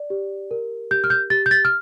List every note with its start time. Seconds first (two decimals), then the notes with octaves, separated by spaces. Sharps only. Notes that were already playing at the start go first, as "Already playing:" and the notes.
Already playing: D5
0.10 G4
0.51 A#4
0.91 G4 G6
1.04 F6
1.10 G6
1.30 G4 A6
1.46 G6
1.51 A6
1.65 F6